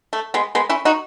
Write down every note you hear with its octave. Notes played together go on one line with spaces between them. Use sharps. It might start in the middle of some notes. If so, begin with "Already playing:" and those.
A3
G#3 B3
G#3 B3
C#4 E4
D#4 F#4